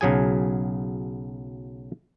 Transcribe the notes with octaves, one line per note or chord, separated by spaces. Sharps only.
B1 C#3 F#3 G#4 G#5